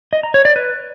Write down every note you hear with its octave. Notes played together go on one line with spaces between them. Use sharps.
D#5
A#5
C#5
D5
B4